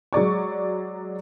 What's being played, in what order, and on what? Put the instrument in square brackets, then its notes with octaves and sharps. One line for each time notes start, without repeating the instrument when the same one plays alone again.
[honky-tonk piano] F#3 G#3 D5 C#6